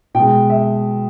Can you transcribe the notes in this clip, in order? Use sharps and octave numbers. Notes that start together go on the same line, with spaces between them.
B2 G5
G#3
E5